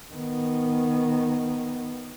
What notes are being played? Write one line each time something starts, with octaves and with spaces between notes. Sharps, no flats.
D#3 B3